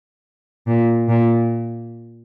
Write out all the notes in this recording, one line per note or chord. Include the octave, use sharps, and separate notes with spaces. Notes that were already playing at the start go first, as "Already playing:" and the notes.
A#2
A#2